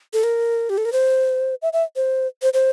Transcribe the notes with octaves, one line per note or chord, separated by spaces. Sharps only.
A4
A#4
G4
A4
A#4
C5
E5
E5
C5
C5
C5